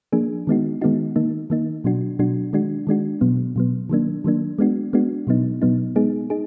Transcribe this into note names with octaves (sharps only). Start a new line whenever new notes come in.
F3 A#3 D4 G#4
D#3 G#3 B3 D#4 F#4
D#3 G#3 B3 D#4 F#4
D#3 A#3 D#4
D#3 A#3 D#4
B2 F#3 D4 F#4
B2 F#3 D4 F#4
D#3 G#3 D4 F#4
D#3 G#3 D4 F#4
B2 F#3 B3
B2 F#3 B3
D#3 F#3 A#3 D4
D#3 F#3 A#3 D4
G#3 B3 D4 F#4
G#3 B3 D4 F#4
B2 F#3 B3 D#4
B2 F#3 B3 D#4
G#3 B3 D#4 G#4
D#4 G#4